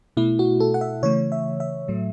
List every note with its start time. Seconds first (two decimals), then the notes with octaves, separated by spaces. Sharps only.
0.17 B2 A3 E4
0.39 F#4
0.60 A4
0.74 F#5
0.81 E5
1.03 C#3 E3 A3 C#5
1.32 E5
1.60 E5
1.88 A2 F#3 A3